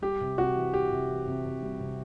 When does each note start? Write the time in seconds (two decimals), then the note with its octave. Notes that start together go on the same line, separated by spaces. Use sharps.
0.02 G3 G4
0.21 C3
0.38 C3 F#4
0.56 E3
0.74 E3 G4
0.91 C3
1.09 E3
1.27 C3
1.46 C3
1.62 G3
1.80 C3